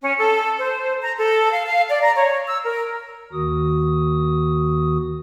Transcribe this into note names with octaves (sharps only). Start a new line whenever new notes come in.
C#4
A4
C5
A#5
A4
F5
F5
D5
A#5
C#5
E6
A#4
D#2 D#3 F#4 D#6